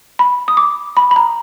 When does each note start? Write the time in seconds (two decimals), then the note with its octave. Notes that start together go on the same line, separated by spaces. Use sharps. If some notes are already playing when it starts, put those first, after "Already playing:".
0.19 B5
0.48 D#6
0.57 D6
0.97 B5
1.11 B5
1.16 A#5